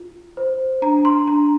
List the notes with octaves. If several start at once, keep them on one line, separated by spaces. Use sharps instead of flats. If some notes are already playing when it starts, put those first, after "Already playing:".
Already playing: F4
C5
D4 A#5
C6
D4 A#5